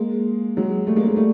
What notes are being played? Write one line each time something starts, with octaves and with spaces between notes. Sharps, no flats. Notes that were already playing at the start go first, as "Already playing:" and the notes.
Already playing: G#3 A#3
F#3 G#3
G3 A3
G#3 A#3
G#3 A#3
G3 A3